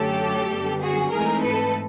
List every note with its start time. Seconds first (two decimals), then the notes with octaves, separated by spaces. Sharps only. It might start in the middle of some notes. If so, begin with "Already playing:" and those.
Already playing: F#2 D3 F#3 A3 C#4 G4 A4
0.51 F#2 D3 G3 B3
0.82 F#4 G#4
1.12 G#2 E3 A3 C4 D#4 G#4 A#4
1.43 A4 B4